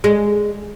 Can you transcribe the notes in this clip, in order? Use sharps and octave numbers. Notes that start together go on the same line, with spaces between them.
G#3